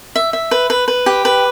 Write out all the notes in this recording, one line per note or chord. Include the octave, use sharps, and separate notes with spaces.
E5
E5
B4
B4
B4
G4
B4